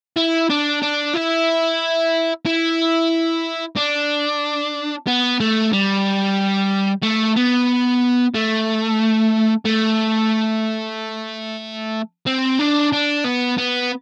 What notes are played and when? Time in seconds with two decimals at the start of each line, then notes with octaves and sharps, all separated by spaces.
0.17 E4
0.50 D4
0.82 D4
1.14 E4
2.46 E4
3.76 D4
5.07 B3
5.40 A3
5.73 G3
7.03 A3
7.37 B3
8.34 A3
9.65 A3
12.26 C4
12.59 D4
12.93 D4
13.24 B3
13.58 B3